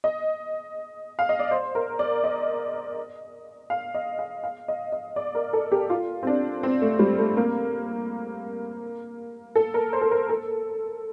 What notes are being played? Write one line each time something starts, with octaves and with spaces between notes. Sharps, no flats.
D#5
F5
D#5
D5
C5
A#4
D5
D#5
F5
D#5
F5
F5
D#5
D#5
D5
A#4
A4
G4
F4
C4
D4
C4
A3
G3
A3
A#3
A4
A#4
C5
A4
A#4
A4